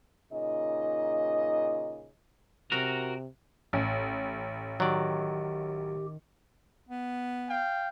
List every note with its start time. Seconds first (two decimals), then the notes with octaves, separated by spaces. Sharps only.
0.32 A#2 C#3 D#4 D#5
2.72 C3 F#4 A#4
3.73 A1
4.80 D#3 F#3 G4 D5
6.89 B3
7.50 F5 G5